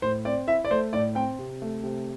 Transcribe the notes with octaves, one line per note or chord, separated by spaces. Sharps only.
A2 C5
C4 D5
E4 E5
D5
A3 C5
A2 D5
C4 G5
C3
A3
C3